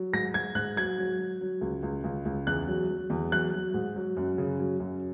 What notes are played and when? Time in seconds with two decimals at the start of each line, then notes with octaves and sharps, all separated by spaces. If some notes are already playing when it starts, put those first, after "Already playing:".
Already playing: F#3
0.13 G#2 A#6
0.34 G#2 G#6
0.55 G#2 F#6
0.76 F#3 G#6
0.98 F#3
1.19 F#3
1.41 F#3
1.61 C#2
1.83 C#2
2.04 C#2
2.25 C#2
2.47 E2 F#6
2.68 F#3
2.89 F#3
3.10 E2
3.32 F#3 F#6
3.53 F#3
3.74 G#2
3.96 F#3
4.17 F#2
4.38 C#3
4.59 F#3
4.80 F#2